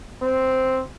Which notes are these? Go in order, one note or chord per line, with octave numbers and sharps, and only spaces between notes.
C4